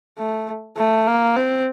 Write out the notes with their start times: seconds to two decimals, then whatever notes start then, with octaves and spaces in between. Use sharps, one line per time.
0.18 A3
0.77 A3
1.07 A#3
1.36 C4